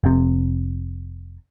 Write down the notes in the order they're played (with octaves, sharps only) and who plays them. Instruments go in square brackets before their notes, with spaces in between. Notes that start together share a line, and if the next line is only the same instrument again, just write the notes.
[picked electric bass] F1 C3